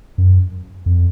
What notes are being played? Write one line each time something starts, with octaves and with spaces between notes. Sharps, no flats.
F#2
F2